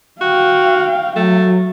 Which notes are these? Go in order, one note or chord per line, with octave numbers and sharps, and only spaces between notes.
F#4 F5 G5
F#3 A3